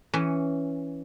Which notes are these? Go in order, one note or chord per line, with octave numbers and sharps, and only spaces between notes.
E3 C#4